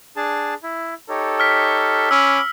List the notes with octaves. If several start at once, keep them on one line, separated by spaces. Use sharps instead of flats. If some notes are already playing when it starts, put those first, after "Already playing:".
D4 G#4 A5
E4
D#4 G4 A4 C#5
F6 B6
C#4 B5 D6 E6